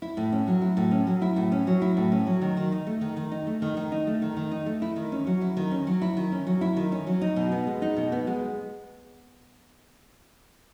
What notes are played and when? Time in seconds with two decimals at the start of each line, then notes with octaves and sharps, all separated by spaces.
0.02 E4
0.17 A2
0.32 C#4
0.47 F#3
0.62 E4
0.77 A2
0.91 C#4
1.07 F#3
1.22 E4
1.36 A2
1.52 C#4
1.67 F#3
1.82 E4
1.97 A2
2.12 C#4
2.27 F#3
2.41 D#3
2.57 D#3
2.72 D#4
2.87 A3
3.01 D#3
3.17 D#3
3.32 D#4
3.47 A3
3.62 D#3
3.77 D#3
3.92 D#4
4.07 A3
4.22 D#3
4.37 D#3
4.51 D#4
4.66 A3
4.82 E4
4.96 D#3
5.12 C#4
5.27 F#3
5.41 E4
5.57 D#3
5.71 C#4
5.87 F#3
6.02 E4
6.17 D#3
6.32 C#4
6.47 F#3
6.61 E4
6.77 D#3
6.92 C#4
7.07 F#3
7.21 D#4
7.36 B2
7.52 B3
7.67 G#3
7.82 D#4
7.96 B2
8.12 B3
8.27 G#3